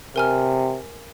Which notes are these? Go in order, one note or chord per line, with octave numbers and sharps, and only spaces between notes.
C3 A#4 G#5 F6